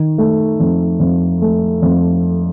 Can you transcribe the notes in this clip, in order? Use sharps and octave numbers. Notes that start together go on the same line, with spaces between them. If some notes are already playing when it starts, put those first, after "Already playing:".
Already playing: D#3
A3
F2
F2
A3
F2